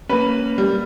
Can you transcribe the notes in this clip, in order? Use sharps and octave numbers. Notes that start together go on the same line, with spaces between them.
A#3 C#4 B4
G3